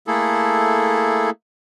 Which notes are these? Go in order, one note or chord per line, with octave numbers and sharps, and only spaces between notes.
A3 A#3 E4 G#4 A4